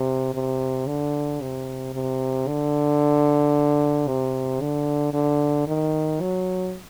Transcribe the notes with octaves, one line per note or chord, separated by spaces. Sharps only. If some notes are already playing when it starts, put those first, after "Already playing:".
Already playing: C3
C3
D3
C3
C3
D3
C3
D3
D3
D#3
F#3